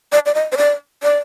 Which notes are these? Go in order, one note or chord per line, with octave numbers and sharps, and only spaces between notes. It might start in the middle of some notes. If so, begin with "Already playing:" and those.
D5
D5
D#5
C5
D5
D5